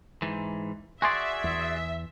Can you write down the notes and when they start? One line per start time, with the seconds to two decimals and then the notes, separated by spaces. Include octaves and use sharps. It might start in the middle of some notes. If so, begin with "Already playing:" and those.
0.22 G#2 E3
1.02 F#4 G#4 D5 E5 G#5 C6
1.44 E2